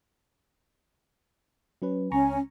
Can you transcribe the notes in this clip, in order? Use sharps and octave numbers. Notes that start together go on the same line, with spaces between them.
F#3 C#4 B4
C#2 C#4 G#5 A#5 C#6